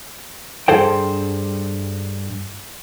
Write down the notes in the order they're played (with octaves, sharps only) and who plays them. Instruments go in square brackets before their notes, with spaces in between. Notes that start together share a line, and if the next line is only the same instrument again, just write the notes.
[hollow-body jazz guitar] G2 G#4 A4 C5 G5